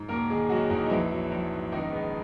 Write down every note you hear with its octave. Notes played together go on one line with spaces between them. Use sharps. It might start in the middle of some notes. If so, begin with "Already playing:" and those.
Already playing: G#2
E1 A#3 A#4
D#3 G#3 G#4
F#3 G#3 F#4
E2 D#3 D#4
D#4
A#1 E3 E4
F#3
A#1
G#2
C#2 D#3 D#4
G#3 B3